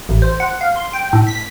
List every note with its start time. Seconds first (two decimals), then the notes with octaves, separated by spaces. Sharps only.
0.09 A1
0.22 C5
0.40 F#5
0.61 F5
0.76 C6
0.93 G5
1.13 A2
1.27 B6